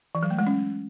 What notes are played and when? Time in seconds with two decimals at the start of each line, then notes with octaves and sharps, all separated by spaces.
0.15 E3
0.23 F#3
0.31 A3
0.39 G#3
0.47 C#4